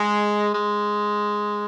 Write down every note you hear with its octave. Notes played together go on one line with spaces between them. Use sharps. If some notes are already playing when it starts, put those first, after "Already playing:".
Already playing: G#3
G#3